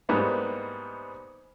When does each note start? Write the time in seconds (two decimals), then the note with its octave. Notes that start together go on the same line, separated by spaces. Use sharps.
0.09 G#2 G3 A#3 B3 D#4 E4